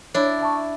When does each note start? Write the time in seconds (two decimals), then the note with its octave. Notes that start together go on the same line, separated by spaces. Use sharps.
0.14 D4 E4 C#5
0.41 E5 A5 C#6